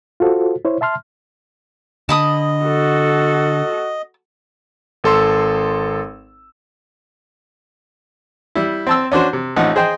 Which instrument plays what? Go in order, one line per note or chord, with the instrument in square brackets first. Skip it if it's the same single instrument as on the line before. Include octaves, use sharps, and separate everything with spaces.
[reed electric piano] F4 F#4 A4 C5
E4 C5 C#5
E5 A5 C6 F6
[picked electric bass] D3 [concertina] D#5 [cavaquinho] A5 B5 D#6
[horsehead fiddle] F#4 A4
[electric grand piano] G#1 A4 C6 E6
[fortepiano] G3 E4
C4 A5 E6
C#4 D4 F#4 C5
C3
A1 A2 F3 D#4 F#5
G#4 C5 D#5 G5